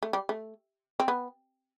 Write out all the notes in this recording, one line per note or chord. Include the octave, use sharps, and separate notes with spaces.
A3
G3
A3
C4
B3